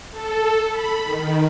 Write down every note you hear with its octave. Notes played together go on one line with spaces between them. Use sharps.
A4
B5
D#3